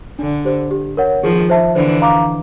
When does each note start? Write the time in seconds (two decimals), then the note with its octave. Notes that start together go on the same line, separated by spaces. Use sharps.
0.19 D3 D4
0.45 G4 C5
0.71 G4
0.97 A#4 C#5 F#5
1.23 D#3 F3 G#4
1.50 C5 E5 A5
1.75 D3 E3 C5
2.02 F5 A#5 D6